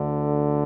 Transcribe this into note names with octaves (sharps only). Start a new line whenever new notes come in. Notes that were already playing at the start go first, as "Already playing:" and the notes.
Already playing: D2 D3